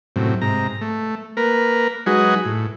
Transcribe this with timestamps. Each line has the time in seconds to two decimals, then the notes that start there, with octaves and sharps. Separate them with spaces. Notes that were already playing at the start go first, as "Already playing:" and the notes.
0.16 F#2 A2 C3
0.41 G#2 C3 A#5
0.81 A3
1.37 A#3 A#4 B4
2.06 F#3 G#3 D#4 F#4 G#4 B4
2.45 A2